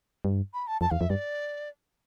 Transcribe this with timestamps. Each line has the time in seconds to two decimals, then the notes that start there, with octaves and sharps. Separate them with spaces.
0.25 G2
0.54 B5
0.67 A5
0.81 F2 A5
0.91 E2 F5
1.00 F2 E5
1.10 G2 D5